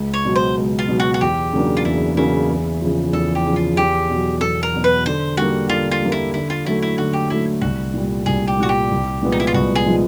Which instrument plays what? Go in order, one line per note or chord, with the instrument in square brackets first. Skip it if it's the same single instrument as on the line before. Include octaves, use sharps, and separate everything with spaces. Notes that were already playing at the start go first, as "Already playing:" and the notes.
Already playing: [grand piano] C#2
[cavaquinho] C#5
[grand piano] B2 F#3
[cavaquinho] C5
[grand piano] C#2
[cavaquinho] F4
[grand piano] B2 F#3
[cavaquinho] F#4
F#4
[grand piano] E2 [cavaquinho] G4
[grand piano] C#3 F#3 A#3 D4
[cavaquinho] F4
[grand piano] E2 [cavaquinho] E4
[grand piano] C#3 F#3 A#3 D4 [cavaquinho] E4
[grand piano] E2
C#3 F3
[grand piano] E2 [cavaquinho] A4
[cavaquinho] G4
[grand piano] C#3 F3
[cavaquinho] F4
[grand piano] E2 [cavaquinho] G4
[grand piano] B2 F#3
[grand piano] E2 [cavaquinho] A4
[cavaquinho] A#4
[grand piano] B2 F#3
[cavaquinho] B4
[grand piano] D3 [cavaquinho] C5
[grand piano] G3 A#3 [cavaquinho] F#4
[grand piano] D3 [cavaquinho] F4
[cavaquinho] F4
[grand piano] G3 A#3
[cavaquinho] E4
[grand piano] D3 [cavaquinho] E4
[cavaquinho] F4
[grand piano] F#3 A3 [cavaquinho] E4
[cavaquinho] E4
[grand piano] D3 [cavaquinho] F#4
[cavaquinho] G4
[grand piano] F#3 A3 [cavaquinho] E4
[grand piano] C2 [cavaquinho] F#4
[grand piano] A#2 G3
[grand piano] C2 [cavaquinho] G#4
[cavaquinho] G4
[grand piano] A#2 G3 [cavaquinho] F#4
[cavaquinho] G4
[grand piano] C2
A#2 F3 G#3 B3
[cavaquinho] D#4
E4
F4
[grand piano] C2 [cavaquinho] F#4
[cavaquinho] G#4
[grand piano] A#2 F3 G#3 B3